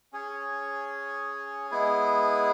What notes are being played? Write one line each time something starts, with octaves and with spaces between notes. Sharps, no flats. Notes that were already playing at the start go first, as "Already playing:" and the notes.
C#4 G#4 C#5
G#3 B3 E4 G#4